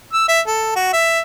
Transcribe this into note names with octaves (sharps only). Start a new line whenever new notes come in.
E6
E5
A4
F#4
E5